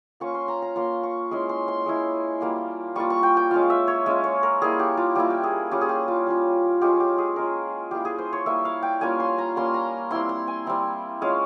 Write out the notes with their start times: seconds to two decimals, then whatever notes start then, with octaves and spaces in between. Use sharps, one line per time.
0.20 A#3 C#4 F4 C#6
0.34 C6
0.48 A#5
0.62 A#5
0.76 A#3 C#4 F4 C6
1.03 C#6
1.31 G#3 C#4 E4 C6
1.49 C6
1.68 C6
1.86 G#3 C#4 E4
2.41 G3 A#3 F4
2.96 G3 A#3 F4 C#6
3.10 C#6
3.23 G5
3.37 G5
3.51 G#3 C#4 F4 F5
3.70 E5
3.88 C#5
4.06 G#3 C#4 F4 E5
4.24 C#5
4.43 A#4
4.62 G3 A#3 E4 G#4
4.79 G4
4.97 F4
5.15 G3 A#3 E4 G4
5.30 G4
5.43 G#4
5.71 G3 C#4 F4 G4
5.81 G#4
5.89 G4
6.08 F4
6.27 G3 C#4 F4
6.81 G#3 C#4 F4 G4
7.00 G4
7.18 G#4
7.36 G#3 C#4 F4 A#4
7.91 G3 A#3 E4 G4
8.05 G#4
8.18 C5
8.33 C#5
8.46 G3 A#3 E4 E5
8.65 F5
8.82 G5
9.01 G3 A#3 C#4 F4 G#5
9.20 C6
9.38 A#5
9.56 G3 A#3 C#4 F4 C6
9.74 A#5
10.11 G3 C4 E4 C6
10.29 C6
10.47 G#5
10.66 G3 C4 E4
11.21 G#3 C#4 F4 F5